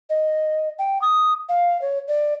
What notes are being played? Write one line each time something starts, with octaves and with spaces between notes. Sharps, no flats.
D#5
G5
D#6
F5
C#5
D5